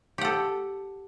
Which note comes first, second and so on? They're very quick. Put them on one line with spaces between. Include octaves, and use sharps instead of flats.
G4 F#5 A4